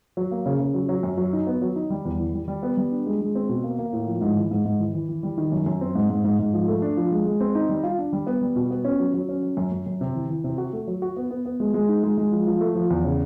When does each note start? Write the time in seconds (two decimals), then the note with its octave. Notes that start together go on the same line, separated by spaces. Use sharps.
0.17 F#3
0.31 A#3
0.46 C#3
0.60 C#3
0.74 F#3
0.89 F#3
1.03 F#2
1.18 F#3
1.33 D#4
1.47 B3
1.62 F#3
1.76 D#4
1.90 G3
2.05 E2
2.19 E3
2.33 G3
2.48 G3
2.63 B3
2.77 G3
2.92 D4
3.06 G#3
3.21 G#3
3.35 C4
3.49 B2
3.64 A#3
3.79 A#3
3.93 A2
4.07 F3
4.21 G#2
4.36 E3
4.51 G#2
4.65 G#2
4.80 E3
4.94 E3
5.09 E3
5.23 G3
5.38 D#3
5.52 F#2
5.66 F#2
5.81 C4
5.95 G#2
6.10 G#2
6.24 G#2
6.39 G#2
6.53 F3
6.68 A3
6.82 D4
6.97 F3
7.12 G#3
7.26 G#3
7.40 C4
7.55 D#4
7.69 G3
7.83 F4
7.98 D4
8.13 G3
8.27 B3
8.41 G3
8.56 B2
8.71 B3
8.85 C#4
9.00 F#3
9.14 F#3
9.29 C#4
9.43 F#3
9.57 F#2
9.72 F#2
9.86 F#2
10.01 C3
10.15 E3
10.29 E3
10.44 C3
10.58 F#4
10.73 A3
10.88 F#3
11.02 F#4
11.17 B3
11.30 B3
11.46 B3
11.60 G#3
11.74 G#3
11.89 D#4
12.03 G#3
12.18 G#3
12.32 F3
12.47 F3
12.61 A3
12.75 F3
12.90 E2
13.04 C#3